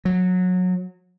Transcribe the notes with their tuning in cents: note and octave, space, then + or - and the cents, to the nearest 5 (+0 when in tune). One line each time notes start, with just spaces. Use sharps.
F#3 -20